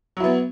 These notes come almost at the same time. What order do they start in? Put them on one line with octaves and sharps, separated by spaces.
F#3 E4 B3